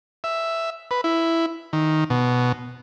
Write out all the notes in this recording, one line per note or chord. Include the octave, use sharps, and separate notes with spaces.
E5
B4
E4
D#3
B2